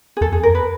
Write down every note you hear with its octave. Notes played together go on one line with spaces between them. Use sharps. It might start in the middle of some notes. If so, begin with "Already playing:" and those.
G#4
E2 A4
F2
G#4
E2
A#4
F2
B4